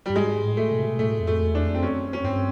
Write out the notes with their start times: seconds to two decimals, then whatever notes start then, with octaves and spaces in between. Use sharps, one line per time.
0.06 G2 G3
0.16 G#2 G#3
0.44 A2
0.57 A3
0.71 B2
0.79 C3
0.86 B2
0.99 A2 A3
1.20 F2
1.27 A3
1.41 E2
1.55 D4
1.62 F2
1.75 C4
1.83 F#2 C#4
2.13 C#4
2.24 G2 C4